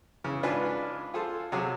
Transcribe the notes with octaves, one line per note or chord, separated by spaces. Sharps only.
C#3 E3
G#2 D4 F4 B4 F5 G#5
F4 G#4 A4 C5
C3 F#3 G#4